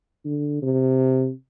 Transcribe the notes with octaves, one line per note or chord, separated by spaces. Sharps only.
D3
C3